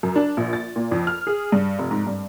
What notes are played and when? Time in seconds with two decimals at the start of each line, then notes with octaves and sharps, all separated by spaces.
0.03 F#2
0.16 D4
0.37 A#1
0.53 A6
0.76 A#2
0.92 F2
1.07 F6
1.27 G#4
1.52 G2
1.79 F1
1.91 G#2
2.07 G2